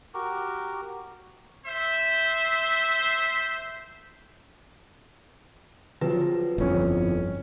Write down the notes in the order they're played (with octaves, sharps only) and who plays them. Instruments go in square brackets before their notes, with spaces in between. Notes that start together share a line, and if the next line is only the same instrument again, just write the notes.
[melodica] F#4 G4 A#4
[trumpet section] C5 E5
[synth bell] D3 B4 [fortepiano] F3 F#3
[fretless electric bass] G1 F2 [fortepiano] E3 C#4